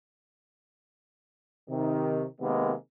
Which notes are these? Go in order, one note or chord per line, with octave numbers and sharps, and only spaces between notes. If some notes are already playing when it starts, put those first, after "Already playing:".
C3 D#3
C3 D#3 G#3 A#3 B3